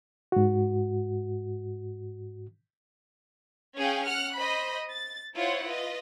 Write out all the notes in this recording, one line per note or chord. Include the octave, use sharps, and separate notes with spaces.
G#2 F#4
C#4 G#4 F5 G5
F#5 F6 F#6
C5 D#5 B5
A6
E4 F4 C5 C#5 F#5
F4 B4 D#5